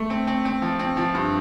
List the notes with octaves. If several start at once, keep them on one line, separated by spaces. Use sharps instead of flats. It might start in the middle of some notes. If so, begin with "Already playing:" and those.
Already playing: A3
C4
C4
C4
F3
C4
F3
G2